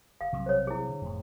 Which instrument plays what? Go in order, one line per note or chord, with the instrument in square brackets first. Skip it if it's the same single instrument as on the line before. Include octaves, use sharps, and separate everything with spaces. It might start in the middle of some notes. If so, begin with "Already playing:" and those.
[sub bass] F#1 [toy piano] F5
[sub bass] B1 [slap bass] C3 F#3 G3
[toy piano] C5 C#5
E4 G#4
[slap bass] D3
[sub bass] F#1 [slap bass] F2 A2